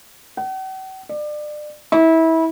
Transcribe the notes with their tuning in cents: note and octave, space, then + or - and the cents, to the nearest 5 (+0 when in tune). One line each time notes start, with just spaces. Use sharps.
F#5 +45
D5 +30
E4 -25